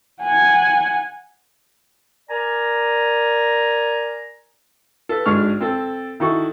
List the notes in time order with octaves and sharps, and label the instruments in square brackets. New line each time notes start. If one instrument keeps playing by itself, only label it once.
[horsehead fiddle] F#5 G#5
[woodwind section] A#4 D5 G#5 A#5
[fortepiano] A4 B4
G#1 G#2 G#3 D4 C#6 F6
C4 A4
D#3 D#4 E4 F#4 A4 C#6